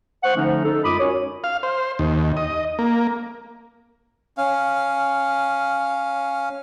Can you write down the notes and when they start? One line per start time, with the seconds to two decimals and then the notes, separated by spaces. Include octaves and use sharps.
0.23 C5 F#5 C#6
0.35 D3 F3 A3 C#4 D#4
0.65 D#4 A4
0.84 F#2 G#3 F4 B5 D6 D#6
0.99 C#4 F#4 A#4 C#5
1.44 F5
1.63 C5
1.99 D#2
2.37 D#5
2.79 A#3
4.38 C#4 F5